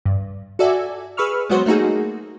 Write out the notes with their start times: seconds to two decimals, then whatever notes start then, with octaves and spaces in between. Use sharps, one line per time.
0.06 G2
0.59 F#4 A4 D5 E5 G#5
1.17 G#4 B4 B5 C#6 E6 F6
1.49 F#3 G#3 B3 F#4 C5 C#5
1.66 A3 A#3 D#4 F#4 G#4